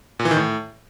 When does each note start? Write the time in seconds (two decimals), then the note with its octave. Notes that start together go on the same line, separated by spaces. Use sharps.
0.19 A#2
0.25 E3
0.31 D#3
0.37 A2